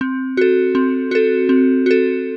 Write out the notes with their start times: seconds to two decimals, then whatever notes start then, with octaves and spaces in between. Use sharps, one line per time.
0.01 C4
0.37 F#4 A4
0.75 C4
1.11 F#4 A4
1.49 C4
1.86 F#4 A4